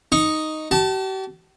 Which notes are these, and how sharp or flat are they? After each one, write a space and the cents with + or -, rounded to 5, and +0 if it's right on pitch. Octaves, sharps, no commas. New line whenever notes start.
D#4 +0 C#6 +0
G4 -45 A5 +0